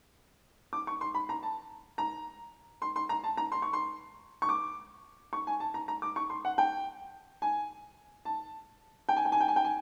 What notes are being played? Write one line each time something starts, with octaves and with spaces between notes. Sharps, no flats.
D6
C#6
C6
B5
A#5
A5
A#5
C6
C6
A#5
A5
A#5
C6
C#6
C6
C#6
D6
C#6
G#5
A5
A#5
A#5
D6
C#6
C6
F#5
G5
G#5
A5
G5
G#5
G5
G#5
G5
G#5
G5
G#5